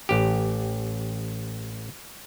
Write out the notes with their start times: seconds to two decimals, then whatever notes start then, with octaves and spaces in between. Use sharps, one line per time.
0.09 A1 G4